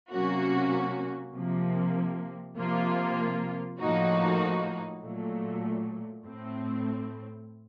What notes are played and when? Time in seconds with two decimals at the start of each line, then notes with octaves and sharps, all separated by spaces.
0.11 C3 F#3 A#3 C#4 F#4
1.33 C3 F3 A#3
2.56 C3 F3 A#3 F4
3.79 A2 F3 A#3 D#4 F#4
5.02 A#2 F#3 A3
6.24 A2 A3 C4